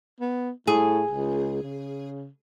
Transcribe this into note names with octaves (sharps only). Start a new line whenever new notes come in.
B3
A2 G#4
C#2
C#3